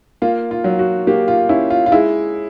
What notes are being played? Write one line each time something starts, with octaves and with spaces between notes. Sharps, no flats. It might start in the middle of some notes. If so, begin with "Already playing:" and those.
A#3 F4
F4
F#3
F#4
A#3 G4
F4
C#4 E4
F4
F4
G#3 E4